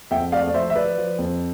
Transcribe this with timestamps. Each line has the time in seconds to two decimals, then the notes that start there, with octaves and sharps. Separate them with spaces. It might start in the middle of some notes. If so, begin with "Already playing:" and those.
0.11 F2 E5 G5
0.32 A3 D5 F5
0.48 D5
0.54 F3 C5 E5
0.70 E5
0.75 F3 B4 D5
0.98 F3
1.19 F2